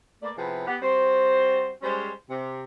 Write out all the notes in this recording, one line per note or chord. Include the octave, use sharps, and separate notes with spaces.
A3 A#3 B4 D5
C3 F3 B3 E4 G#4 B4
B3 G4 F#5
G3 C4 F#4 C5
G3 G#3 C#4 C5
C3 G4